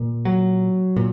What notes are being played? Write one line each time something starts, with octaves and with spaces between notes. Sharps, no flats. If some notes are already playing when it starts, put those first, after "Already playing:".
Already playing: A#2
F#3
A#2